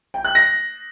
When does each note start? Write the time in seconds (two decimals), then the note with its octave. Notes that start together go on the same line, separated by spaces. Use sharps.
0.14 G5
0.25 F#6
0.35 A#6